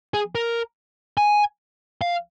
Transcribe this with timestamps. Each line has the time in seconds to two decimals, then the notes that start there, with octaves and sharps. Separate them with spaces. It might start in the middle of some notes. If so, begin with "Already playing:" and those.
0.14 G#4
0.35 A#4
1.17 G#5
2.01 F5